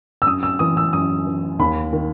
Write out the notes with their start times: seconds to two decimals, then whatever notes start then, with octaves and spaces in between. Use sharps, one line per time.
0.22 E6
0.26 F#2 D#6
0.43 E6
0.59 E3 D#6
0.77 E6
0.93 F#2 D#6
1.26 E3
1.59 D#2 B5
1.93 D#3